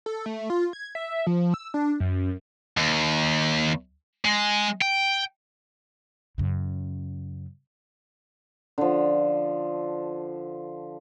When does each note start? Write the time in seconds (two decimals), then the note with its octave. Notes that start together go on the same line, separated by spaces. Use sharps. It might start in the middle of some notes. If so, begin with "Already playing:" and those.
0.06 A4
0.26 A3
0.50 F4
0.73 G#6
0.95 E5
1.27 F3
1.54 E6
1.74 D4
2.00 F#2
2.77 D#2
4.25 G#3
4.81 G5
6.38 F#2 C#3
8.78 D3 F3